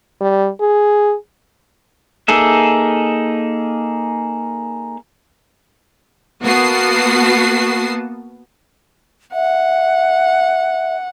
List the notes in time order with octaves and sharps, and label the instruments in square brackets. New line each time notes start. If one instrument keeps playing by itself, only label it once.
[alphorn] G3
G#4
[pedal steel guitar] A#3 D#4 G#4 A4 E5
[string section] A#3 B3 F#4 A5 D#6 C7
[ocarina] E5 [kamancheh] F#5